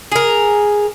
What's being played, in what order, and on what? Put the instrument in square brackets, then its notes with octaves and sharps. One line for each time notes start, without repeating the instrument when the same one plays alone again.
[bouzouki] G#4 A#4